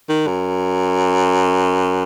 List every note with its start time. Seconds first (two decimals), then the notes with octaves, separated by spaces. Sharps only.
0.09 D#3
0.27 F#2